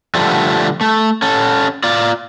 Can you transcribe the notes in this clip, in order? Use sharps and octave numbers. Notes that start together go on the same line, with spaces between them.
D3 F3 G3 A3
A3
C#4 A4
F4 D5